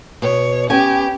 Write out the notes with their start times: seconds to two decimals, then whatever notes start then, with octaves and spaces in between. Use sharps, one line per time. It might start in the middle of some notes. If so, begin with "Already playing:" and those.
0.22 B2 C#5
0.70 B3 C#4 G4 G#5